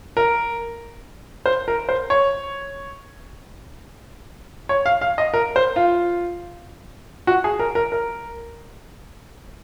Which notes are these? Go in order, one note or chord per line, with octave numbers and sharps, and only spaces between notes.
A#4
C5
A#4
C5
C#5
C#5
F5
F5
D#5
A#4
C5
F4
F#4
G#4
A#4
A#4
A#4